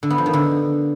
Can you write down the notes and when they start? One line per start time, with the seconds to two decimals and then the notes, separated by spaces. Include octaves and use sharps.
0.03 D3
0.10 B3
0.18 F3
0.26 D#3
0.33 D3